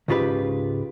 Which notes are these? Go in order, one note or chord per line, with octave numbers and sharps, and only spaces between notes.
C#2 G#2 C#3 F4 G4 B4